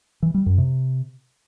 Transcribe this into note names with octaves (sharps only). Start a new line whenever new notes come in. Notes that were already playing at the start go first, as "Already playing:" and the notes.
E3
G3
F#2
C3